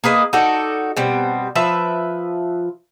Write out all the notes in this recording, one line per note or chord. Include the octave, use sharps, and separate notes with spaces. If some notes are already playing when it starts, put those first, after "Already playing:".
A#3 G#4 B4 D#5
D#4 F#4 A4 D5
B2 G3 C4
F3 B4 E5